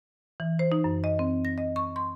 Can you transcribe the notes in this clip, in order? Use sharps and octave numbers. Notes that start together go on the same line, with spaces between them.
E3
C5
D#4
F#2
D#5
C4
A#6
D#5
C#6
C6